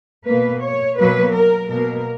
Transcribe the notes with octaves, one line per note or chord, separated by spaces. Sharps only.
B2 A#3 B4
C#5
B2 F#3 A#3 B4
A#4
B2 A#3 A#4